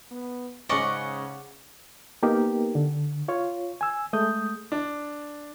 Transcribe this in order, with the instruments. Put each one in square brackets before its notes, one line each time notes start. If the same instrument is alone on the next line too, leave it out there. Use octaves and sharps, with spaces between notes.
[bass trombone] B3
[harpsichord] G#2 C#4 D#5 [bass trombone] C#3 [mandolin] D5 F#5 [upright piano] C#6
[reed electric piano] A#3 B3 D#4 G4 A#4
D3
F4 C#5
G#5 E6
G#3 A3 D#6 G6
[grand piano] D4